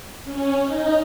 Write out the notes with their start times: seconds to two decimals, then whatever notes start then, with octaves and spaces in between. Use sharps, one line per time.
0.25 C#4
0.65 D#4